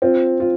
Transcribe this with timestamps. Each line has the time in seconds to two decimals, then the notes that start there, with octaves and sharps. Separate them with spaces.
0.02 C4 F4
0.40 F4